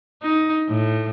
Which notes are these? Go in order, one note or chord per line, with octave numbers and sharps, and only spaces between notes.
D#4
A2